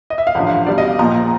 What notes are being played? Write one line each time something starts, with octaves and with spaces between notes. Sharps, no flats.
D#5
E5
F5
A1 G2 D3 F3 F#5
F5
E2 B2 G3 D5
D#5
F5
A#1 A#2 F3 A#5